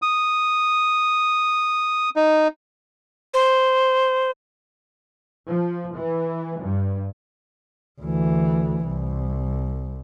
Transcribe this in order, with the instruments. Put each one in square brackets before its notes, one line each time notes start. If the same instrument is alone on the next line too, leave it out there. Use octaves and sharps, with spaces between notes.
[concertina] D#6
D#4
[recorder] C5
[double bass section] F3
E3
G2
[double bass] D2 E3
C2